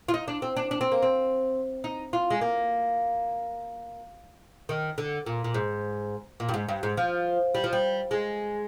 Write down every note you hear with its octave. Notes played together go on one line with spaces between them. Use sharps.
F4
D#4
D4
C4
D4
D4
C4
A#3
C4
D#4
F4
G#3
A#3
D#3
D3
A#2
A#2
G#2
A#2
G2
G#2
G2
G#2
F3
G3
F3
G3
G#3